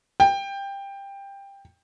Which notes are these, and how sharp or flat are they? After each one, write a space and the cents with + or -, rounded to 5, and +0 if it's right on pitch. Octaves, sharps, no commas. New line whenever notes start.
G5 +15